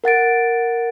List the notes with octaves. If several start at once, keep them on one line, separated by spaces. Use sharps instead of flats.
A#4 F#5 A6 D7